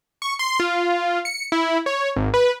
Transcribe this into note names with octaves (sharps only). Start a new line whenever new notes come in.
C#6
C6
F4
C#7
E4
C#5
G#1
B4